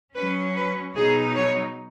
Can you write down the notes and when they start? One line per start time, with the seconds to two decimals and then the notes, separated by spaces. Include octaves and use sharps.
0.15 F#3 C#4 B4
0.55 B4
0.96 B2 F#3 D#4 G#4
1.36 C#5